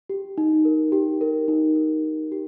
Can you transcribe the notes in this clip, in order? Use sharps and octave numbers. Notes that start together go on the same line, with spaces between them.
G4
D#4
A#4
G4
A#4
D#4
A#4
D#4
G4